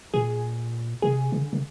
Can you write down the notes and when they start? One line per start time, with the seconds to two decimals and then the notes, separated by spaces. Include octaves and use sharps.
0.14 A#2 G#4
1.02 C3 G#4
1.32 C#3
1.43 D3
1.53 C#3